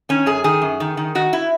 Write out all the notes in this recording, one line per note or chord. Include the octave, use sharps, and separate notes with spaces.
D#3 C#4
F#2 G#4
D#3 G#4
F#2
D#3
D#3
D#3 F#4
E4